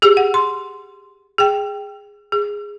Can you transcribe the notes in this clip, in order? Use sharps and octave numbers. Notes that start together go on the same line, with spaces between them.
G4 G#4
F#5
C6
G#4 G5
G#4